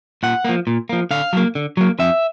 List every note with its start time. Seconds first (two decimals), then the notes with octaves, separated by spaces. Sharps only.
0.23 A#2 F#5
0.45 F3 A#3
0.67 A#2
0.89 F3 A#3
1.11 D3 F5
1.33 F#3 A#3
1.55 D3
1.77 F#3 A#3
1.99 F2 E5